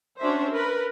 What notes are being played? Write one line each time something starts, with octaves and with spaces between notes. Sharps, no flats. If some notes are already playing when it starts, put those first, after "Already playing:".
C#4 D4 F#4 C5 E5
A#4 B4